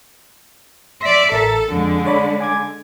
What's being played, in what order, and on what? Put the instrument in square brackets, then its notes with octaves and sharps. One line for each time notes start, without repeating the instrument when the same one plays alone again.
[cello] D5 E5 [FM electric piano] C6 A#6 B6
[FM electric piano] A1 A#4 A#5 [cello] A4
[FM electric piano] F2 [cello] D3 G#3
[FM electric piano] C#5 D5 B5
G#5 D6 G#6